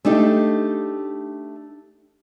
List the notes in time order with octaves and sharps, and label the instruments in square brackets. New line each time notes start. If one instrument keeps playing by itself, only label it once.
[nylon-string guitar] A3 D4 D#4 G4